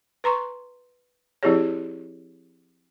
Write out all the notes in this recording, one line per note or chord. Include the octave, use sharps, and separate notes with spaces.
B4 A#5 C6 C#6
F3 C4 E4 G4 G#4 C#5